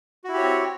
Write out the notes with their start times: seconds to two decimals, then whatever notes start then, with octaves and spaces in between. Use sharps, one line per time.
0.24 F#4
0.29 E4
0.33 G4
0.38 C#5
0.42 C4